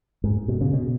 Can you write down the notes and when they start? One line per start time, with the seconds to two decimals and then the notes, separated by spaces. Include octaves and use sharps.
0.24 G#2
0.48 B2
0.61 C#3
0.73 B2